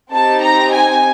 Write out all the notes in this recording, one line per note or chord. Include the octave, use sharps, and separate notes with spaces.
C4 D#4 G4 A5
A#5
G#5